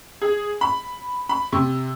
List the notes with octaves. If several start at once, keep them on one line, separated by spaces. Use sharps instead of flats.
G#4
B5
B5
C3